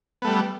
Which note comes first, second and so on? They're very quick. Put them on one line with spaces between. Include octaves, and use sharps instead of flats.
B3 A3 G3